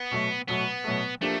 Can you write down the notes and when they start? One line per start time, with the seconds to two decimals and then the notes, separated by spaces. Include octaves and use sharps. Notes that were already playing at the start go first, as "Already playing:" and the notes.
Already playing: B3
0.11 B2 F#3 A3
0.48 B2 F#3 A3 B3
0.84 B2 F#3 A3
1.21 F3 A3 A#3 D4 G4